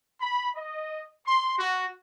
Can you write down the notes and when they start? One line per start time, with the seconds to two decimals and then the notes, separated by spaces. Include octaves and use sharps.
0.21 B5
0.56 D#5
1.27 C6
1.58 F#4